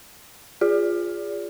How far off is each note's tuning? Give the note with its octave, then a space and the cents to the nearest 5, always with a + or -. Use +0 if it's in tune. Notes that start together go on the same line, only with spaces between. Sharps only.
F4 +0 G#4 -20 D5 -30